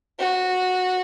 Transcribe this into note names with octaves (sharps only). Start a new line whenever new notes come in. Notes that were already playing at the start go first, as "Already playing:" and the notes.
F#4